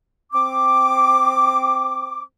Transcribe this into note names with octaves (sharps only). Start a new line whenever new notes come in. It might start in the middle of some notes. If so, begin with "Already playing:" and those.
C4 D6